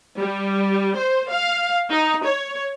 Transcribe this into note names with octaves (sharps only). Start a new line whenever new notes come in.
G3
C5
F5
D#4
C#5